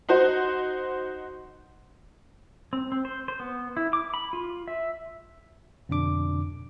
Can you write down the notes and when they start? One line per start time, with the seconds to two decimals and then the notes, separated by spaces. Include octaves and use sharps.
0.09 D#4 F#4 C5
2.73 C4
2.92 C4
3.05 C5
3.28 C5
3.40 B3
3.77 E4
3.93 D6
4.14 B5
4.33 F4
4.68 E5
5.89 F2 B2 D3 D4 D6